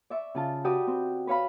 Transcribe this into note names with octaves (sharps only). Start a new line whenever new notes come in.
D5 E5 C#6
C#3 F4 A5
F#4 G4 B4 D5 G5 D#6
C4
B4 C#5 F5 B5